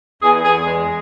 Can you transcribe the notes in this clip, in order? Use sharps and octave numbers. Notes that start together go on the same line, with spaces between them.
E2 G#4
E2 G#4
G#3